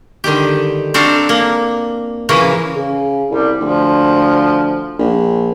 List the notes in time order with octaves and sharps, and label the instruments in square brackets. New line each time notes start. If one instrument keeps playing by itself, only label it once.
[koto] D3 D#3 G3 G4
C4 D4 F#4 A4 A#4 F5
A#3
C#3 E3 F3 A#3 F#4
[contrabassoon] C#3
[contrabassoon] C2 [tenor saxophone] G3
[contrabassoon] D2 [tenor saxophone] F3
[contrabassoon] A#1